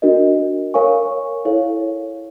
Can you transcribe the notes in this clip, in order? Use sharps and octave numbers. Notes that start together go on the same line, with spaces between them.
D4 F#4 A#4 D#5
A#4 C#5 F5 G#5 C#6
E4 A4 C#5 F5